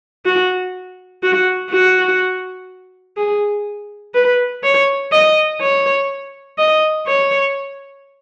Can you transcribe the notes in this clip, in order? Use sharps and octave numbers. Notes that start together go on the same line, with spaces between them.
F#4
F#4
F#4
G#4
B4
C#5
D#5
C#5
D#5
C#5